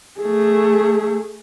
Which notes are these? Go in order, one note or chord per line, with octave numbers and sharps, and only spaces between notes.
A3 G#4